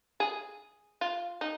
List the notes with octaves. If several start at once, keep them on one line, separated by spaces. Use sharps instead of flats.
G#4
F4
D#4